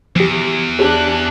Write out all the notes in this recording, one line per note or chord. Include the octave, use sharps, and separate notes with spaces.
E2 F3 G4
D4 G4 G#4 F#6